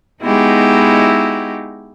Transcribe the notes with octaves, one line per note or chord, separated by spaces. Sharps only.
G#3 B3 D#4 E4 F#4 G4